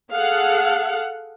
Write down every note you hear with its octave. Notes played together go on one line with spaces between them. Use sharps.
G#4 A4 F5 F#5